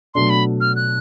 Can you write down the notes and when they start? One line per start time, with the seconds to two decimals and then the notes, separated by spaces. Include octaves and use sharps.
0.14 B2 F#3 A3 D4 C6
0.30 B5
0.61 F6
0.76 F#6